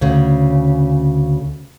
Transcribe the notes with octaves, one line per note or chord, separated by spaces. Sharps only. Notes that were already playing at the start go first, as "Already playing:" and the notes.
D2 C#3